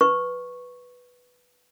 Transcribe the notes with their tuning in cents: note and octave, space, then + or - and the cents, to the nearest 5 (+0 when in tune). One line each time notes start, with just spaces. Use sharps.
B4 +0 C#6 -5